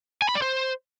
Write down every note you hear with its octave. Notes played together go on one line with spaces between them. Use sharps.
G#5
B5
D5
C5